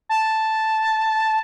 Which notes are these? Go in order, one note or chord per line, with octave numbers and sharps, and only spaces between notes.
A5